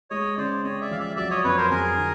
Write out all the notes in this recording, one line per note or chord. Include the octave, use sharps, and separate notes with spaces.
G#3 C#5 D#5
C#3 C5 D5
C4 C#5 D#5
D5 E5
F3 F5
D5 E5
F#3 D5 E5
C#5 D#5
F2 B4 C#5
A#4 C5
F2 G#4 A#4
D3